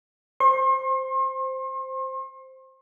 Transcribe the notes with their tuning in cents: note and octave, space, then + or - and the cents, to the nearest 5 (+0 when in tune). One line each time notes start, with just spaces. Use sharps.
C5 +0 C6 +40